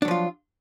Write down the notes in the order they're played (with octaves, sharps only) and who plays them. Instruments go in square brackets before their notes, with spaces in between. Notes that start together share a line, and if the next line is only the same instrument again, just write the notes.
[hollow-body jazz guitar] D4
F#3
F3
F4